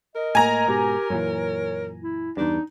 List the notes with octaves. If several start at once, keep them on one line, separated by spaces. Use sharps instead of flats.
A#4 D#5
A2 A#3 G#5 A#5
G#2 B2 G4
F#2 A#2 E3 C#5
E4
E2 G2 D4 D#4